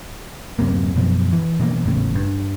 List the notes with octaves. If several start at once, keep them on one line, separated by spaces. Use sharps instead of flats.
D1 F#2 C3 A#3
F#2 B2 F3
E3
B2 E3 A3 A#3
G#1 E2 A2 C#3
G2